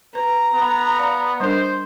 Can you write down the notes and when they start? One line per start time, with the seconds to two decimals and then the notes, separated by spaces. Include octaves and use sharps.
0.15 B4 A#5
0.54 B3
0.99 D5 F5
1.40 G3 D4 A#4 C5